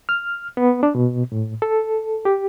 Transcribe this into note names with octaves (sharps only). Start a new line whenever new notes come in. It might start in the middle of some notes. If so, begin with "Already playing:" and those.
F6
B3
D4
B2
A2
A4
G4